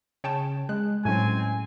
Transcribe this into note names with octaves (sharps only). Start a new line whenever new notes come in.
C#3 C#5 G5 A5
G#3 F#6
A2 F#3 C4 C#4 G#5